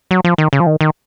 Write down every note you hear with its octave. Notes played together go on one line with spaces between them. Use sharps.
F#3
F3
D#3
C#3
F3
D#3
D#3